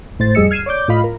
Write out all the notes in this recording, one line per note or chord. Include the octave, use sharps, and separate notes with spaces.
G#1 A2 C5 A6
F2 G3 G#4 D#5 E6 C#7
F6 G#6 C7 D#7 E7
C#5 D5 D6 G6
A2 F4 D#5 F5 B5
A#4